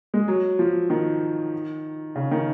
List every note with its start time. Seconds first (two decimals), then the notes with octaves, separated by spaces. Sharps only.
0.14 G#3
0.28 F#3
0.59 F3
0.90 D#3
2.16 C#3
2.31 D#3